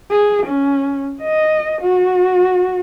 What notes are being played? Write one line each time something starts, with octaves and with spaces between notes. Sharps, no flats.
G#4
C#4
D#5
F#4